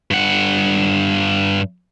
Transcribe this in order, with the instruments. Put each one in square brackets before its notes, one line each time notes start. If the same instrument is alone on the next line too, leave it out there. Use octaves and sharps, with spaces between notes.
[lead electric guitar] G2 F#5